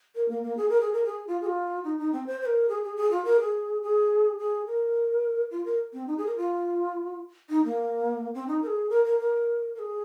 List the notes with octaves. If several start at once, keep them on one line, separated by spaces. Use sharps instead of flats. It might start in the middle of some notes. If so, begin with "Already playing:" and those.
A#4
A#3
A#3
G#4
A#4
G#4
A#4
G#4
F4
G#4
F4
D#4
D#4
C4
C5
C5
A#4
G#4
G#4
G#4
F4
A#4
G#4
G#4
G#4
A#4
F4
A#4
C4
D#4
G#4
A#4
F4
D#4
A#3
C4
D#4
A#4
G#4
A#4
A#4
A#4
A#4
G#4